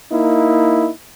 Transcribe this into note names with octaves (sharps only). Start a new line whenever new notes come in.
A#3 D#4 E4